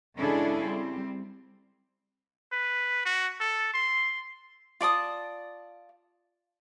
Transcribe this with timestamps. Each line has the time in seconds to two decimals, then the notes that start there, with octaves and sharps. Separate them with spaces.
0.19 C#3 G#3 D4 E4 G#4 A4
0.60 G3 C4
2.52 B4
3.05 F#4
3.40 A4
3.74 C6
4.81 F4 D5 A5 D#6